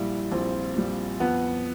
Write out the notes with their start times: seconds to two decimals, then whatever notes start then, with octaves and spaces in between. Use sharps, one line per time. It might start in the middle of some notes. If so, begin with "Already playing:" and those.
Already playing: A#1 A#2 G3 E4
0.32 A#1 C4
0.76 A#2 G3
1.20 F2 B3